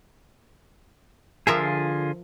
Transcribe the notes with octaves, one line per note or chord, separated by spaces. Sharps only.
D3 F3 F4 G#4 A#4 E5